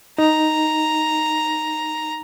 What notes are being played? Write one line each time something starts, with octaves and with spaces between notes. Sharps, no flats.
D#4 A#5